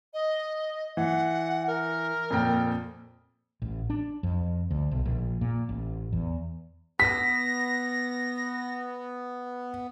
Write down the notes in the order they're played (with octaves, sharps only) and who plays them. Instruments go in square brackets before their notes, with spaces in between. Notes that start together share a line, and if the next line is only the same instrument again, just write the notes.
[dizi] D#5
[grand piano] E3 [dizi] F#5
[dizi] A#4
[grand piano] F2 A#2 G5
[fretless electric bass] A1
D4
F2
D2
B1
A#1
A#2
A1
E2
[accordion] B3 [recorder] A#6 [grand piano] B6